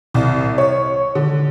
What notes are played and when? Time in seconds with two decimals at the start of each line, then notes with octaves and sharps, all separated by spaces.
0.14 C2
0.58 C#5
1.15 D3